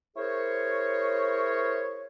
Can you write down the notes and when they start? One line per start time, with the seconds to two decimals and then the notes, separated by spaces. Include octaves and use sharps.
0.16 E4 G#4 A#4 C5 C#5